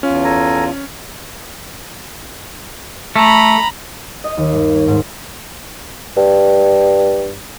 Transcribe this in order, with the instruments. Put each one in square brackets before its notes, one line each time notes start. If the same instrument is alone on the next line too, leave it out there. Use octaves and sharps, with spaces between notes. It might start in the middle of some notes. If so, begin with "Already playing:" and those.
[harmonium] E2 F4 [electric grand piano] C#4
[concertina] A4 G#5 A#5
[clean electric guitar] A3 [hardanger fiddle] A#5 B5
[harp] D#5
D#2
G2
C#5
G#2
[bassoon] G2